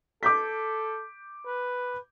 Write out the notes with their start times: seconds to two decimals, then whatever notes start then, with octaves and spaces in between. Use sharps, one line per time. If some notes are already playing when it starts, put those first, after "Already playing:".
0.23 A4 D6 G6 B6
1.46 B4